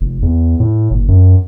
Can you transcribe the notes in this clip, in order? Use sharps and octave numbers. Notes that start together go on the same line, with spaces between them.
F1
E2
A2
F#1
F#2